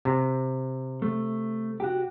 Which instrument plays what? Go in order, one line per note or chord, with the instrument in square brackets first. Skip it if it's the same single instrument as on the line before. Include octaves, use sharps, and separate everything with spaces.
[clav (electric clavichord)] C3
[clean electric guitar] A3
F#4 G4